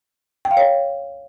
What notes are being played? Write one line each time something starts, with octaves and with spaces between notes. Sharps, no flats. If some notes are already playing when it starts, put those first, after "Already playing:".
G5
F5
C#5